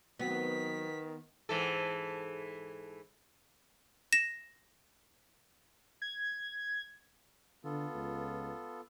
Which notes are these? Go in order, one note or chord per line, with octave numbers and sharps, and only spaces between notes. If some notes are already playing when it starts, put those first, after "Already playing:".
D#3 F#3 B3 C4 F#4 B6
G#2 E3 A4
A#6 E7
G#6
D3 B3 F4 A4
C#2